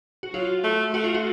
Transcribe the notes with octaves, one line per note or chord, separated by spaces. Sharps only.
F#4
F#3 F4
A3
A3 F#4
F4
F#4